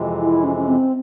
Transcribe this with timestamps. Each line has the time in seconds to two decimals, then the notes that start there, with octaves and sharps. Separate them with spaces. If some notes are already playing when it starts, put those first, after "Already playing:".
Already playing: F2 C3 E3 G#3
0.20 E4
0.43 C#4
0.56 C#4
0.67 C4